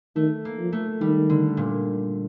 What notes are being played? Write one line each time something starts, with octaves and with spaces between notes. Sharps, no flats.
D#3 A3
A#3
F3
A3
D#3 G3
D3
A#2